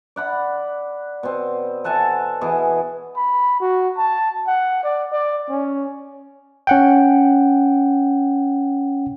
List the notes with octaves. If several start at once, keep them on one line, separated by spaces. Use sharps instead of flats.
D5 F#5 B5
B2 C4
A4 F#5 G#5 A5
B2 E3 G#4
B5
F#4
A5
F#5
D5
D5
C#4
C#4 F#5 G5